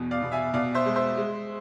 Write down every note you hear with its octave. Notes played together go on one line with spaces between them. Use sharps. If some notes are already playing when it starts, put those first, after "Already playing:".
Already playing: E2 B2
D5 F5
B2
E5 G#5
B2 D5 F5
C5 E5
G#3
C5 E5
G#3